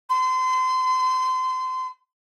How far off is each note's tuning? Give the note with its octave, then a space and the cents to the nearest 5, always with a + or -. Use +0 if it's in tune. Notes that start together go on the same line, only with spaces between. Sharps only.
C6 -30